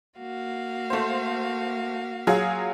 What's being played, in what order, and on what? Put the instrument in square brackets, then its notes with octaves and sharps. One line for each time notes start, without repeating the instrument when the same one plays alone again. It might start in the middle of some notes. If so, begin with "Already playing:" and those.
[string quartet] A#3 F#4 F5
[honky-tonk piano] A3 C5
F#3 F4 G#4